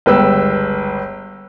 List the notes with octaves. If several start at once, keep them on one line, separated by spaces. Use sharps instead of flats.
G1 C#2 B4 G5 E6